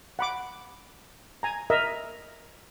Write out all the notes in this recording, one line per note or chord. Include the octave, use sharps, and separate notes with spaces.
F#5 B5 D6
G#5 A#5
A#4 D#5 E5